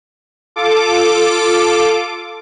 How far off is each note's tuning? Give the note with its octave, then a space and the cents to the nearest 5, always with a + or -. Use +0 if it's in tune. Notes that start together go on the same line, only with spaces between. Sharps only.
F4 +0 A4 +0 D6 +0